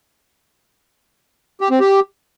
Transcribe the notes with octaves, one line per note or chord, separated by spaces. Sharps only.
G4
C4
G4